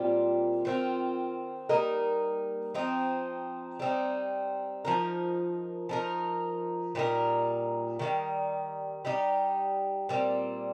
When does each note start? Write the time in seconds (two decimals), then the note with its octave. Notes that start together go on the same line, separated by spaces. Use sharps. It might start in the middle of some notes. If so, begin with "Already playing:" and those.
Already playing: A#2 G3 C4 F4
0.65 D#3 C4 F4
1.69 G3 A#3 D#4 A#4
2.75 F3 C4 D#4
3.80 G3 C4 D#4
4.85 F3 D#4 A#4
5.89 F3 D#4 A#4
6.95 A#2 G3 D#4 A#4
7.99 D#3 G3 D#4
9.05 G3 D#4 G4
10.09 A#2 G3 C4